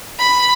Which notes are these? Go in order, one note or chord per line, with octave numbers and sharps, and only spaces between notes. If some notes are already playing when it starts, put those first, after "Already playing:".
B5